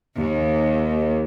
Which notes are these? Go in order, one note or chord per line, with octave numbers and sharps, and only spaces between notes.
D#2